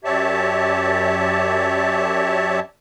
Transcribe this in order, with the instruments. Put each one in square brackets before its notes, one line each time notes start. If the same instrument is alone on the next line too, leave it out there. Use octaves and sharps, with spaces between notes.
[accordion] F#2 G4 C#5 D5 E5 A5